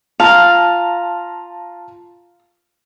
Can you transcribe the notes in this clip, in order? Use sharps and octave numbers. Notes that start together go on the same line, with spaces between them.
F4 F5 A5 A#5